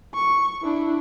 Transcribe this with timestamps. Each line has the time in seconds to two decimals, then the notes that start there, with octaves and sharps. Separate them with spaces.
0.14 C#6
0.62 D4 E4